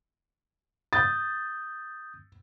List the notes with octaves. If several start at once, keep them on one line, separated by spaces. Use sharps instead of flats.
D#6 G6 A6